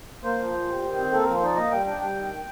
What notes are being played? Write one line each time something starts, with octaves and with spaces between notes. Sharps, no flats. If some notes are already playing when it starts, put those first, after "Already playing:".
A#3 C5
F3
A#2
G3
D#3
C4
A#3 A4
F3 A#4
C5
D#4 D5
A#3 D#5
G3 G5
D4 G5
G3 G5
D#3